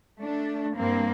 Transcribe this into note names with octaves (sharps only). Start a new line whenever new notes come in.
A3 D4
G2 A#3 C4